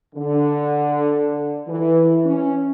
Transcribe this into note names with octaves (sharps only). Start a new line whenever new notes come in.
D3
E3
C#4